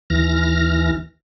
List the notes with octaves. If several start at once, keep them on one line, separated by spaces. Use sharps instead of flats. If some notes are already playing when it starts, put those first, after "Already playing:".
D#2 E3 F6 A#6